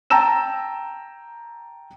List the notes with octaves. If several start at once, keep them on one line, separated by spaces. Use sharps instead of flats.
G5 A5 A#5 E6 E7